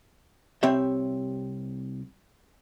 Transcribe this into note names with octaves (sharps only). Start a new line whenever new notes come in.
C2 C4 G4 C#5 E5